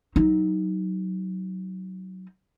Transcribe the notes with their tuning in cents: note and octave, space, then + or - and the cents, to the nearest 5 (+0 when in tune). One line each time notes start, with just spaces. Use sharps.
F#3 +15 D#4 +10